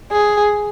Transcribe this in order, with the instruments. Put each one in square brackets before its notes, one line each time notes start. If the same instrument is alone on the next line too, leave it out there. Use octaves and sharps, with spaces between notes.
[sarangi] G#4